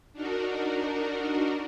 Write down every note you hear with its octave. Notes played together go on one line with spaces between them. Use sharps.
D4 D#4 F#4 A#4